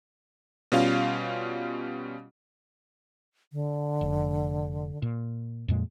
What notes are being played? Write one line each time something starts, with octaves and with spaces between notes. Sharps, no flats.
B2 G3 C#4 F4 F5
D3
F1
A#2
F2 A#2 G#3